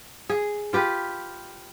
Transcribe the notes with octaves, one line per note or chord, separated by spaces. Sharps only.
G#4
F4 G4 B4